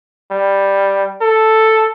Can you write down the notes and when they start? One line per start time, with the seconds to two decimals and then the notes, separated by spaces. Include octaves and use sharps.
0.31 G3
1.22 A4